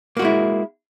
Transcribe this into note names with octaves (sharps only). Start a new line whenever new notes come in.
G#3 A#3 E4 F#4